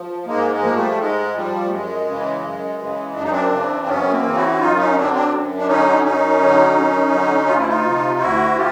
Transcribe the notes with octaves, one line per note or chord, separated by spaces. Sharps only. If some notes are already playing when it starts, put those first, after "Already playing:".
Already playing: F3
G#2 G#3 A#3
G#3
F3 A#3
G3 A3
G3
G#2 G#3
F3 G3
A3
F#2 G#3
C#3 E3
F#2
C#3 E3
F#2 D4
D#4
C4 D4
C#3 E3
F#2 B3 C#4
A#3 C4
C#3 E3
E4 F#4
E4
F#2 D#4 F4
C#4 D#4
D3 F#3 C4 D4
C4 D4
F#2
D4
D3 F#3 C#4 D#4
F#2 C#4 D#4
D3 F#3
F#2
D3 F#3
D2 F4
E4
D#4 F4
C3 F3
D2 E4 F#4
F3 F4 G4